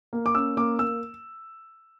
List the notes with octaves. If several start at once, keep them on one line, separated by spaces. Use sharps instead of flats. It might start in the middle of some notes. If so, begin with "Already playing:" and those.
A#3
D6
C#4 E6
A#3 D6
A#3 E6